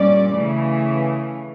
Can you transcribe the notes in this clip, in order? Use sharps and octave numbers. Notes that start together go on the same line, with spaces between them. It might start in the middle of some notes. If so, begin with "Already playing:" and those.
Already playing: A#2 G3 C#4 D5
C#3 E3 A3